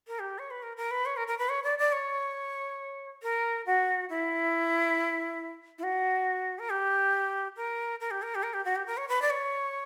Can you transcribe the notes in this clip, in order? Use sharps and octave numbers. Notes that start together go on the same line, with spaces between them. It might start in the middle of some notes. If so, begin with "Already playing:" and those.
A#4
G4
C#5
B4
A#4
A#4
B4
C#5
A#4
A#4
B4
C#5
D5
D5
C#5
A#4
F#4
E4
E4
F#4
A#4
G4
A#4
A#4
G4
A#4
G4
A#4
G4
F#4
G4
A#4
C#5
B4
D5
C#5